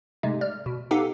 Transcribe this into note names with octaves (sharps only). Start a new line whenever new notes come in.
G#2 C3 G#3 A3
D5 F6
B2
B3 D#4 G4 A4 F5 F#5